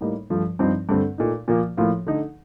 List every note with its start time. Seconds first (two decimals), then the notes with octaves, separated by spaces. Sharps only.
0.01 A2 G3 A#3 D#4
0.30 G2 F3 A3
0.59 G2 F3 C4 D#4
0.89 G2 D3 A3 C4
1.18 A#2 A3 D#4
1.48 A#2 F3 A#3
1.77 A2 F3 A#3 F4
2.06 D3 A3 D#4